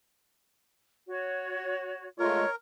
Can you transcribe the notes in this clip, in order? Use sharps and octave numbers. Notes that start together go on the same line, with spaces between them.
F#4 C#5
G#3 A3 F4 A#4 C#5